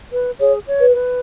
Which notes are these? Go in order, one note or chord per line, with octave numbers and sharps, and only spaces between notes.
B4
G#4 C#5
C#5
B4
B4